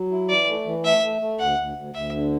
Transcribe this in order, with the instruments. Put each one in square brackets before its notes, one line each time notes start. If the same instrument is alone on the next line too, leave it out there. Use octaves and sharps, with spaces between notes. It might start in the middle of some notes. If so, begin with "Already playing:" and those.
Already playing: [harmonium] F#3
E4
[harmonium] E3 [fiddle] D5
[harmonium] A3
E3
[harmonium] A3 [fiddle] E5
[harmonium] A3
A3
[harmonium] D2 [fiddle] F#5
[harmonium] D2
D2
[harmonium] D2 [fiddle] E5
[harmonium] D3